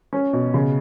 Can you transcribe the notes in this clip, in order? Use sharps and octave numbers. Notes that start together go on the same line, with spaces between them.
C#4
B2
C#3